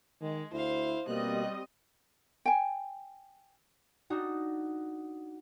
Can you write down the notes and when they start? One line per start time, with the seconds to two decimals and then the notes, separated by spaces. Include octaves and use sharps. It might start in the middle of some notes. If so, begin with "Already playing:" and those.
0.21 D#3 G#3
0.52 D2 E4 C5 F5
1.08 B2 G3 A#3 C4 D#5 F#6
2.46 G5 G#5
4.10 D4 D#4 F#4